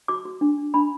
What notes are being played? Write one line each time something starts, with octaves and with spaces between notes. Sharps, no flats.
F#4 D6
F#4
D4
D4
D4 B5